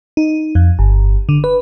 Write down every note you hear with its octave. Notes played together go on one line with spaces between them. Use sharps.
D#4
F2
G1
D3
B4